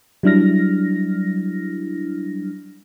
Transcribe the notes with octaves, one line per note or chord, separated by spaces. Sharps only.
F#3 G3 D4 E4 F6 A#6